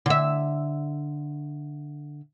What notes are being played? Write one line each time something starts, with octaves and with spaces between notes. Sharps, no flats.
D3 E5